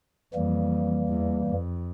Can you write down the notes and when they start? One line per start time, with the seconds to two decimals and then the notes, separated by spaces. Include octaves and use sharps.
0.34 F2 E3 G3 A#3
1.08 E2
1.46 F2